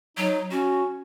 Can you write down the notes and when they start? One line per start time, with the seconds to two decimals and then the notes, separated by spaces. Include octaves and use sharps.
0.17 F#3 D#4
0.51 C#4 F#4